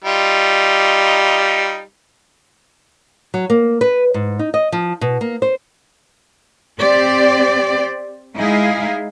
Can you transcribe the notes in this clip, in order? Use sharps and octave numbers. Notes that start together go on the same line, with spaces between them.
G3 D#4 F4
F#3
A#3
B4
G#2
D#4
D#5
F3
B2
A#3
C5
C4 G4 C5 D5
G#3 D#4 E4 G#4 F5